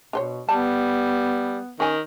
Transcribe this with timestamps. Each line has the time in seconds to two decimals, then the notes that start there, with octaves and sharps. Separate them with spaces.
0.13 B2 D4 C5 C#5
0.49 G3 B3 A5
1.80 D#3 C#4 G#5